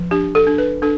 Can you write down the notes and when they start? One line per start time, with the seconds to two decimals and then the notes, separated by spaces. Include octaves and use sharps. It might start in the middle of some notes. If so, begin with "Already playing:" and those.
Already playing: F3
0.11 D4 G4
0.35 A4
0.47 D4
0.58 B4
0.82 D4 A4